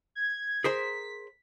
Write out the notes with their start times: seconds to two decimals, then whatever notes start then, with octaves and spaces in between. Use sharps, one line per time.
0.15 G#6
0.64 G#4 A#4 C5 B6